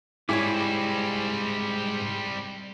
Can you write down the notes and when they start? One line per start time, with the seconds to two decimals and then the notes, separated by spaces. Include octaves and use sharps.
0.29 G#2 G3 C4 E4 G4 C#5 G#5 D6